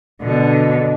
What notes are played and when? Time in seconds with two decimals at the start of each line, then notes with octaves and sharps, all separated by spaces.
0.22 B2 D3